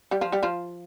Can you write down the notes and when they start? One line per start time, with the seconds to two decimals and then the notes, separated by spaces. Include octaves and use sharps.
0.11 G3 G4
0.21 F3 F4
0.32 G3 G4
0.43 F3 F4